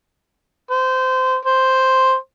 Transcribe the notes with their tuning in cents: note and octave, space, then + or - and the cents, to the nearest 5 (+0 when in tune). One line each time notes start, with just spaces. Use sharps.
C5 -20
C5 +0